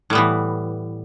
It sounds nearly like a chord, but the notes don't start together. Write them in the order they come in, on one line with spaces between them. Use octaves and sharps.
A2 G3 B3 E3